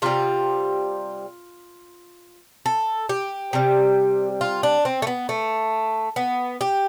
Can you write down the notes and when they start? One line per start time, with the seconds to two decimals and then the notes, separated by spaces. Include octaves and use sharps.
0.02 C3 G3 F4
2.66 A4
3.09 G4
3.53 C3 G3
4.41 F4
4.63 D4
4.85 C4
5.02 A3
5.07 B3
5.29 A3
6.16 B3
6.61 G4